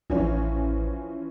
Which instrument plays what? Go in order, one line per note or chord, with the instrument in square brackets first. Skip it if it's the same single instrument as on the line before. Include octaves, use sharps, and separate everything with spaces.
[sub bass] A1 [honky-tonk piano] E3 F3 C#4